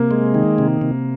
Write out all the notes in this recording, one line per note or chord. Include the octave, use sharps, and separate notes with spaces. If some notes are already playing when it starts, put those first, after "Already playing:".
Already playing: C3 A#3
G#3
D#3
C3
C3